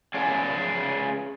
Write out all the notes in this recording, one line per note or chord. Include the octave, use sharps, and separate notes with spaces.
C#4 F4 G#4 D5